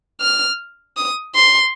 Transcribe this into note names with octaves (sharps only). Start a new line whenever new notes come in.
F6
D#6
C6